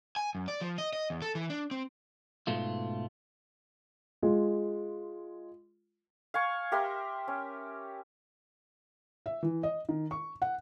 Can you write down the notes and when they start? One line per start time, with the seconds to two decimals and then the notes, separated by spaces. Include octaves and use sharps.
0.16 G#5
0.35 F#2
0.48 D5
0.61 F3
0.78 D#5
0.93 D#5
1.10 E2
1.22 A4
1.35 E3
1.50 D4
1.71 C4
2.47 G#2 B2 A3 F4
4.23 G#3 F4
6.34 F5 G#5 C#6
6.72 G4 A#4 E5 C6
7.28 C#4
9.26 E5
9.43 E3
9.63 D#5
9.89 D#3
10.11 C#6
10.42 F#5